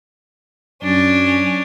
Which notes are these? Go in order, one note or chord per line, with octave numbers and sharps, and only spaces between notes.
F#2 C#4 D4